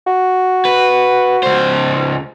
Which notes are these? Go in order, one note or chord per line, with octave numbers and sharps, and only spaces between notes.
F#4
B4
C#2 C5